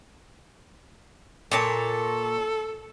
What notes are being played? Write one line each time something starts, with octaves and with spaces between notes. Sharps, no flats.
A#2 A4 C#5 A5